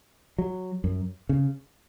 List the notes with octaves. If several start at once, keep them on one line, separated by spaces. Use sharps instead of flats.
F#3
F#2
C#3